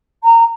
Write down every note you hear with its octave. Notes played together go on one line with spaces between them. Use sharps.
A#5